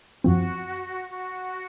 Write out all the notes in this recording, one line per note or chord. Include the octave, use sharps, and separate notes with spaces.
F#2 F3 C4 F#4
F#4